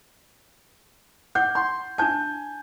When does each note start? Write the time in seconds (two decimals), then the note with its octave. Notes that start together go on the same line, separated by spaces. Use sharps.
1.35 F#5 D6 G6
1.55 C6
1.98 D4 G#5 A5 G6